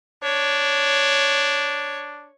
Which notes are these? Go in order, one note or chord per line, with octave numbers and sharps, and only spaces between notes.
D4 C#5